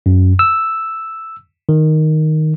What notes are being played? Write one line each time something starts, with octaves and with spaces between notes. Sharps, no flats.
F#2
E6
D#3